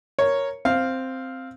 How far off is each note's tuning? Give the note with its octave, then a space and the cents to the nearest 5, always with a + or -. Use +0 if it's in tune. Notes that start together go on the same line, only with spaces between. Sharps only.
A#4 +0 C#5 +0
C4 +0 F5 +0